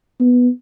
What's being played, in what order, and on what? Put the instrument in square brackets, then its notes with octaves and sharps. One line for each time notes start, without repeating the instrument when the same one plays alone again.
[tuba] B3